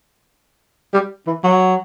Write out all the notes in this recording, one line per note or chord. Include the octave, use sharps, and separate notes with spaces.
G3
E3
F#3